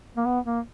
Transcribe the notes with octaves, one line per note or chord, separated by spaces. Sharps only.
A#3
B3
A#3